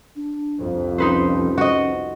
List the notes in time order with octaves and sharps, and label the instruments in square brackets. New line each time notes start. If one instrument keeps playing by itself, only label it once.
[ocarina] D4
[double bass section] C2 F2
[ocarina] C#4 [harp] D#4 B4 C5
[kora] F#4 D#5